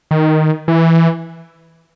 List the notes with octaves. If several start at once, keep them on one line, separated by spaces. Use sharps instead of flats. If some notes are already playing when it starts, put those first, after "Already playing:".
D#3
E3